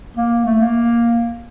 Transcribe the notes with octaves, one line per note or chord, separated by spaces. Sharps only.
A#3
A3
A#3